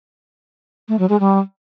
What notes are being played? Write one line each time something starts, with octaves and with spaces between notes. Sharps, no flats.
A3
F#3
G#3
G3